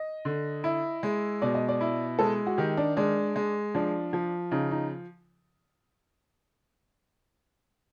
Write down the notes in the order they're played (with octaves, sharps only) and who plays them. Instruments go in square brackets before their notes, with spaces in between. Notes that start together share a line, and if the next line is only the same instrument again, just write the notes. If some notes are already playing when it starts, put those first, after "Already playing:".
Already playing: [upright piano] D#5
[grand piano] D3
E4
G#3
[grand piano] B2 [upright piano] D5
[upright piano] D#5
D5
[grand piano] E4
[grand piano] G#3 [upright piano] A4
[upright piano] F#4
[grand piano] D#3 [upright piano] G4
[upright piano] D4
[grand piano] G#3 [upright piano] D4
[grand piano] G#3
[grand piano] F3 [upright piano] D4
[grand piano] F3
[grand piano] C#3 [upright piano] D#4
[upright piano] D#4